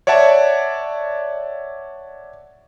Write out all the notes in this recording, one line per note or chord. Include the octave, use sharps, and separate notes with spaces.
C#5 D5 E5 F#5 A5